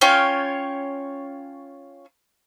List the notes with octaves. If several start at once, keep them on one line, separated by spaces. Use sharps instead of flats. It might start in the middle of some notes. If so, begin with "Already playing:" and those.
C#4 F4 C#5 G5